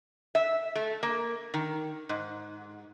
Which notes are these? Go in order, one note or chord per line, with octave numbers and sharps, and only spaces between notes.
E5
A3
A#3
D#3
G#2